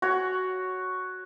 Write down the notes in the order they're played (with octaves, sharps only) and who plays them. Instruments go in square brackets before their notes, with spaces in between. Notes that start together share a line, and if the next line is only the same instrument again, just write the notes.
[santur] F#4 C#5